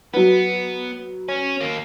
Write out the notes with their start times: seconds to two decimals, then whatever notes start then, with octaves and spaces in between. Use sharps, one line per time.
0.14 F#3 B3 B4
1.29 C#4
1.61 D#2 A#3